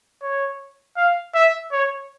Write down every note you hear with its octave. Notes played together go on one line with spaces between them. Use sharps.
C#5
F5
E5
C#5